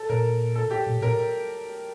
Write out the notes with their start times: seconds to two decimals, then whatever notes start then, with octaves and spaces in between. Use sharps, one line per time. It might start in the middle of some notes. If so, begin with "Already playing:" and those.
Already playing: A4
0.09 A#2 A#4
0.55 A4
0.71 G4
0.87 A#2
1.01 A#2 A#4